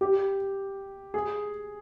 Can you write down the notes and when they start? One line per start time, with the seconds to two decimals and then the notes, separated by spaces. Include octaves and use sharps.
0.01 G4
1.14 G#4